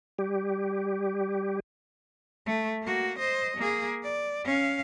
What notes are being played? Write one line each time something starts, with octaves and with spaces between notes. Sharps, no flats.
G3 G4
A3
A#3 F#4
C5 D#5
A#3 G#4
D5
C#4 F5